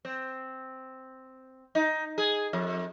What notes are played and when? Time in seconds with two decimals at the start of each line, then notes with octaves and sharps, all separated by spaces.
0.05 C4
1.75 D#4
2.18 G#4
2.53 F2